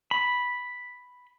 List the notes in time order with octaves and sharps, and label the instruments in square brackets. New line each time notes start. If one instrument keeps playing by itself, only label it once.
[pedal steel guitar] B5